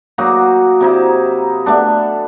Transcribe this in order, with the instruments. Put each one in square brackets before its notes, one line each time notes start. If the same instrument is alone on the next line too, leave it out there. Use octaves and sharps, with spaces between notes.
[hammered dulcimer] F#3 A#3 D#4 F#4
C3 D#4 E4
A3 B3 D4